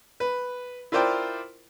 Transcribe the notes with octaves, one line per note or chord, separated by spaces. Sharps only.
B4
E4 F4 A#4 C5 D5 G5